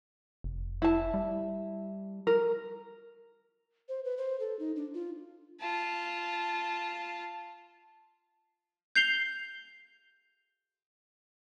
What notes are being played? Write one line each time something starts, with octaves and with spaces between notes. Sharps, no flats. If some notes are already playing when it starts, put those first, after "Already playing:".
F1
E4 A5
G3
A#4
C5
B4
C5
A4
D#4
D4
F4
F4 A5
G6 C7 F7 G7